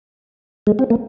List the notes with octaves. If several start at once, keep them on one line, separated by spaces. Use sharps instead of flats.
G#3
C4
A#3